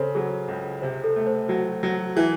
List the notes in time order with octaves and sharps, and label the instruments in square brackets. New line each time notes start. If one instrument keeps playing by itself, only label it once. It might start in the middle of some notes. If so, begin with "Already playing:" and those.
Already playing: [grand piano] C#3 C4 [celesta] G#4 A4 C5 C#5
[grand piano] F#3 [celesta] G#4
[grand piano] C#2
[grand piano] C3 [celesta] C5
[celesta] A4
[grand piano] A3
[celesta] C5
[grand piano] F#3 [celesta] F#4
[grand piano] F#3 [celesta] F#4
[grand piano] E3 [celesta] G#4